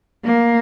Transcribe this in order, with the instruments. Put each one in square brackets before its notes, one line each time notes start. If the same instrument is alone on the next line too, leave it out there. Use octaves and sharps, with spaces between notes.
[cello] A#3